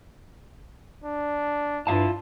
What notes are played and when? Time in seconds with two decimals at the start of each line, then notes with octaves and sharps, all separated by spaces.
1.04 D4
1.87 G2 E4 F4 F5 A5